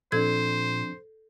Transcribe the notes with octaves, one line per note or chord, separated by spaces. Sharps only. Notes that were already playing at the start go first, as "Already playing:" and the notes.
A#2 F3 C4 D4 A4 C5 G#6